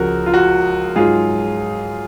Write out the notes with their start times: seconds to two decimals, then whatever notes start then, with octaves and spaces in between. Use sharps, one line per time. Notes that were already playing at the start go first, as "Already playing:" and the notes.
Already playing: C#2 C#3 F3 F#4 A#4
0.26 F4
0.34 F#4
0.96 G#2 F#3 F4 G#4